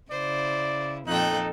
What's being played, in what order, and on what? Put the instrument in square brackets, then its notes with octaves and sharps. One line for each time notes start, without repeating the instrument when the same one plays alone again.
[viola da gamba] C#3 E4 [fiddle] C5 [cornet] D5
[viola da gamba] F2 A#2 A4 [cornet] D#4 [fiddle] G5 F#6